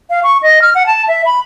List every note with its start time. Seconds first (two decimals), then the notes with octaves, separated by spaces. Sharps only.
0.10 F5
0.24 C#6
0.42 D#5
0.62 F6
0.75 F#5
0.87 A5
1.08 E5
1.26 B5